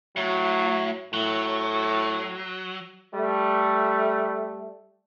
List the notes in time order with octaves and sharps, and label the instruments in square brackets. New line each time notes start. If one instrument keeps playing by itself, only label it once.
[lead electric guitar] A2 [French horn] F#3
[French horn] A2 [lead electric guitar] F#3
[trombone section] G3 A3